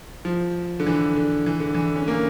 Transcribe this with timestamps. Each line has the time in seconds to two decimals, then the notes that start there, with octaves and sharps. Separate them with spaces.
0.25 F3
0.80 D3
0.86 E3
1.16 D3
1.46 E3
1.60 D3
1.74 E3
1.96 C#4
2.08 A#3